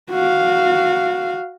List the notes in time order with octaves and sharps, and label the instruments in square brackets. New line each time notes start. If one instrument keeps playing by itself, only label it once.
[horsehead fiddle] F#4 F5